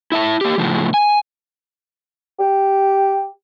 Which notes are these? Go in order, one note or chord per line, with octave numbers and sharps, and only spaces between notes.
E4 E5 A5
A#3 G4
A2 C#3 F3 G3
G#5
G4